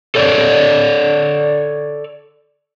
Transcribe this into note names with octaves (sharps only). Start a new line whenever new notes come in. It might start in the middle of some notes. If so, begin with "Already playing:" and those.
A4 C#5 D5